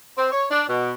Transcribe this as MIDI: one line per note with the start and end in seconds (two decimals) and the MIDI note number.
0.17 0.30 60
0.31 0.45 73
0.51 0.63 62
0.68 0.93 47